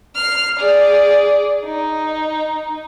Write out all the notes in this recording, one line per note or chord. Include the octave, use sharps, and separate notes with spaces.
F6 C7
G#4 D5
D#4